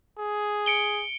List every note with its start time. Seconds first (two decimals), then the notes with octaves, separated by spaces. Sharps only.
0.19 G#4
0.66 C#7 D7 G7